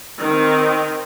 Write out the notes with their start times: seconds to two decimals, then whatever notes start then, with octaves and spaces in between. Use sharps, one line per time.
0.21 D#3 C4